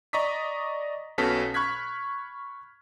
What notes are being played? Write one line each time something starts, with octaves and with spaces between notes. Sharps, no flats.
D5 D#5 A#5 C#6 D#6 B6
B1 B2 C#4 A4 B6
B5 C#6 F6 F#6 G#6 B6